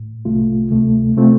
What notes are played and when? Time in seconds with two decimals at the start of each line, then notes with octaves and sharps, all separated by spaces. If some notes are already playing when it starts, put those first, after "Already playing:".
Already playing: A2
0.25 C2 C3 A3 F4
0.71 D2 C3 A3
1.17 C3 A3 C4 F4